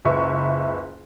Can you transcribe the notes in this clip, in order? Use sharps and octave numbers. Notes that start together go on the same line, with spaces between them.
F#1 C#2 B4 E5 C#6